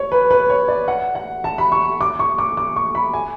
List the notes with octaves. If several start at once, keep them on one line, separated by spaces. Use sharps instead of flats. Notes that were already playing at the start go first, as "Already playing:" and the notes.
Already playing: C#5
B4
B4
C#5
D5
F#5
F#5
A5
B5
C#6
D6
C#6
D6
D6
C#6
B5
G#5